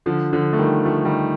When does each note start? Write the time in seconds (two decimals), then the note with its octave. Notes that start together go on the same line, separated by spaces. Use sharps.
0.06 D3 F3
0.33 D3 F3
0.53 A3
0.59 D#3 G3
0.85 F3 A3
1.05 D#3 G3